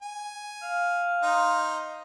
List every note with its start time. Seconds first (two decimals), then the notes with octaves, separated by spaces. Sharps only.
0.02 G#5
0.62 F5
1.23 D#4 C5